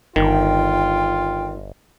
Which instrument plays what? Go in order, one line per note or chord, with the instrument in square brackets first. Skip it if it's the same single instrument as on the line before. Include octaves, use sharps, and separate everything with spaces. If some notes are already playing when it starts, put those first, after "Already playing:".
[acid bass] G1 [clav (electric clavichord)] D#3 [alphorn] F4 [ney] G5